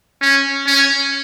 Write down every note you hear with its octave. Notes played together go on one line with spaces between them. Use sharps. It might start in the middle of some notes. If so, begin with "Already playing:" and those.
C#4
C#4